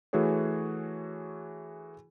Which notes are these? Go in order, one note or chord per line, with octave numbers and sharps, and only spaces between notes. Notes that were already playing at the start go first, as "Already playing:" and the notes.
E3 A3 F#4 G#4 C#5